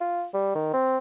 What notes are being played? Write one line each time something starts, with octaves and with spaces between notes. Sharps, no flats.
F4
G3
D#3
C4